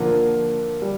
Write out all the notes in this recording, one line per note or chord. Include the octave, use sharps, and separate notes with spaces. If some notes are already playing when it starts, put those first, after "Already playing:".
Already playing: D3 F3 A#3 F4
G3